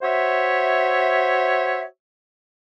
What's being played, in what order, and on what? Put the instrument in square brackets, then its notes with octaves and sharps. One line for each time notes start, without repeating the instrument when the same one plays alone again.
[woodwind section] F#4 C5 C#5 E5